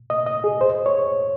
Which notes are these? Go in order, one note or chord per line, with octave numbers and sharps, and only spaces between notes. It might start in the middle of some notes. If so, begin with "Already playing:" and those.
D#5
D#5
G#4
C5
C#5